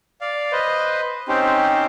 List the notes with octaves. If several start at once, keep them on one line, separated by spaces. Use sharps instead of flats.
D5 F5
B4 C5 D#5
C4 C#4 D#4 G4 C5